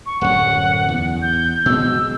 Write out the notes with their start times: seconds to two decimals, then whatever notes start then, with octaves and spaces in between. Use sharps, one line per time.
0.06 C#6
0.21 D1 F#2 F#5
0.89 E2
1.22 G6
1.66 B2 G#3 E6